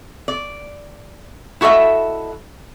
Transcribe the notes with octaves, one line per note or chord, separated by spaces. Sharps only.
D5
E4 F#4 A4 D#5 E5